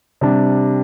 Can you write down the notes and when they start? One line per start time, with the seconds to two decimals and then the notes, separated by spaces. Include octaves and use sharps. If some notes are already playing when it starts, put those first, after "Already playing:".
0.21 C3 G3 D4